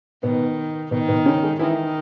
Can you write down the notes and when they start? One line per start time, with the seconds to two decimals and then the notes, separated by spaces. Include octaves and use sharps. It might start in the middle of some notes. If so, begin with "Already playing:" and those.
0.23 B2 D#3 B3
0.91 B2 D#3 B3
1.08 B2 B3
1.26 C#3 C#4
1.43 G#3 G#4
1.59 D#3 E3 E4